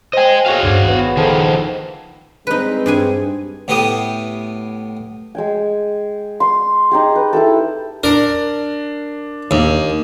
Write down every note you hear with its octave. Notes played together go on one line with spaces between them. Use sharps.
C5 D#5 G5 G#5
F#4 G#4 C#5 F5 F#5
D2 G2 D5 G#5
G#1 B3 C#5 E6
D#3 F3 G#4 A4 C5
G3 G#3 C4 D#4 B4
G2 G#4 G#5
A2 B3 G4 B4 D#6
G#3 G5 G#5
C6
D#4 G4 G#4
B4
E4 G4 A4
D4 A#4
D#2